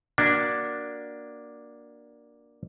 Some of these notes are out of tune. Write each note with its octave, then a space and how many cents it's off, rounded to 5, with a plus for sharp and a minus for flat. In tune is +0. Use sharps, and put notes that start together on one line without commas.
A#3 +15 D4 +0 F#4 +0